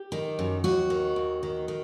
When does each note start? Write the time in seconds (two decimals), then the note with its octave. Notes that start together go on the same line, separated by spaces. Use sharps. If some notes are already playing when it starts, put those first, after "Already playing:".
Already playing: G4
0.12 D#3
0.39 F#2
0.64 D#2 F#4
0.90 D#3
1.16 D#2
1.43 D#3
1.68 D#3